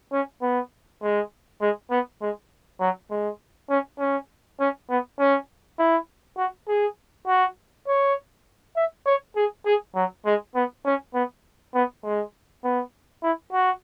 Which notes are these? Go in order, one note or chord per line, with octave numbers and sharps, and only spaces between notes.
C#4
B3
G#3
G#3
B3
G#3
F#3
G#3
C#4
C#4
C#4
B3
C#4
E4
F#4
G#4
F#4
C#5
E5
C#5
G#4
G#4
F#3
G#3
B3
C#4
B3
B3
G#3
B3
E4
F#4